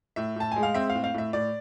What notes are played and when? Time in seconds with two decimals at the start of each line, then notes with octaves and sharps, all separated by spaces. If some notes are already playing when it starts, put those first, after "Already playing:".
0.16 A2 E5
0.36 A2 A5
0.52 G#3 G#5
0.63 F5
0.74 C4 E5
0.90 F5
0.95 A2
1.04 F5
1.14 A2 E5
1.33 A2 D5